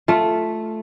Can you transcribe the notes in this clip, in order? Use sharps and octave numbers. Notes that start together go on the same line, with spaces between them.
A3 F4